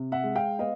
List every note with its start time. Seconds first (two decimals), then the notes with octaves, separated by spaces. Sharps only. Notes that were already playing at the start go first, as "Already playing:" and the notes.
Already playing: C3
0.12 E5 F#5
0.24 G#3
0.35 F5 G5
0.59 B3 D#5 F5